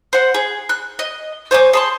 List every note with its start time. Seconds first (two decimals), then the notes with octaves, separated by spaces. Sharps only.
0.13 C5 F#5
0.34 G#4
0.69 F#6
0.99 D#5
1.51 C5 C#5 G#5 D6
1.73 G#4 A5 C6